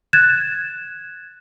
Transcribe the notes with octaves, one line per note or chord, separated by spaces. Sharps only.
F#6 G#6 A6 E7